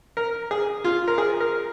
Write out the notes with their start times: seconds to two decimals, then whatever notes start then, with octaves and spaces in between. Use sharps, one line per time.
0.17 A#4
0.51 G#4
0.84 F4
1.08 A#4
1.18 G#4
1.40 A#4